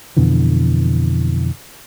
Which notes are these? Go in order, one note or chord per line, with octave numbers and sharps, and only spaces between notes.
F2 B2 D3 E3